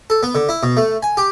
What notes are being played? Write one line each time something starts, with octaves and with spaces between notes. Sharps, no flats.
A4
B3
D3
E4
B2
A3
G#5
G4